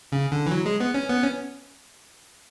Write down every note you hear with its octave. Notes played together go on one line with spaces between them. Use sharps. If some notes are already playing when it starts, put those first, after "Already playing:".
C#3
D3
E3
F#3
G#3
B3
C#4
B3
C#4